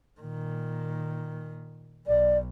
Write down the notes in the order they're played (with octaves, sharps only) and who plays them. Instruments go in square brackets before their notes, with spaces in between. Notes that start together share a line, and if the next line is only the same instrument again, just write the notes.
[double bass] A#2 D#3
[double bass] B1 [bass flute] D5